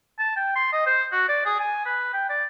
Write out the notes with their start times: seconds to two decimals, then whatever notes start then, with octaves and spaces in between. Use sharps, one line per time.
0.19 A5
0.36 G5
0.56 C6
0.72 D#5
0.86 C5
1.12 F#4
1.29 D5
1.46 G#4
1.59 G#5
1.86 B4
2.13 G5
2.29 D5